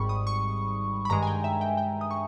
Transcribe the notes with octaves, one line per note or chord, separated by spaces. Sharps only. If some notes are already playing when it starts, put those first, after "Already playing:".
Already playing: G#1 G#2 G3 B5 C#6
D#6
C#6
B5
G2 D#3 G#3 A#5
G#5
G5
E5
G5
G5
D#6
C#6